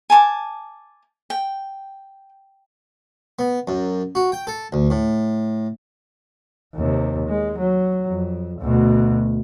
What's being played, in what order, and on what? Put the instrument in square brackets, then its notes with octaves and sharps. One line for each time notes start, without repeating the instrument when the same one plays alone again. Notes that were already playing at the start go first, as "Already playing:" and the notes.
[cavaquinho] G#5 A5 C#6 D6
G5
[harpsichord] B3
F#2
F#4
G5
A4
D2
A2
[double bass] D#2 C3
G#3
F#3
F2
D2 B2